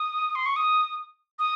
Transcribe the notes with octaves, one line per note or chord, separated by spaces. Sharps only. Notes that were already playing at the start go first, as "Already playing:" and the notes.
Already playing: D#6
C6
C#6
D#6
D#6